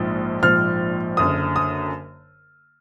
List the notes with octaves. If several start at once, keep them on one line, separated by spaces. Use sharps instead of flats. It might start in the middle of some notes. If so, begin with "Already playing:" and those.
Already playing: A#1 G#2 F3
A#1 G#2 F3 F6
F#1 F#2 D3 D#6
D#6